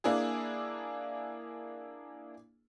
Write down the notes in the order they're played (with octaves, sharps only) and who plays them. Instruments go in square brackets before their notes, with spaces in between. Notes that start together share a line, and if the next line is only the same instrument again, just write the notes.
[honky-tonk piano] A#3 D4 E4 G#4